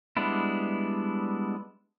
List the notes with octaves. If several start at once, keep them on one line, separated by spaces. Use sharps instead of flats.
G3 G#3 B3 D4 E4